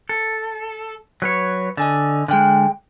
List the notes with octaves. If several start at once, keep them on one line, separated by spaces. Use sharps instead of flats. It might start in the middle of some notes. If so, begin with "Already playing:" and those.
A4
F#3 B4 C#5
D3 D#5 G#5 A5
D3 G#3 G5 F6 F#6